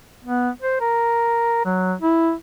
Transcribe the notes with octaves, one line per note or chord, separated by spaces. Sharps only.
B3
C5
A#4
F#3
E4